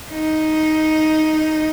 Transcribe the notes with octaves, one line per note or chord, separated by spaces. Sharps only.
D#4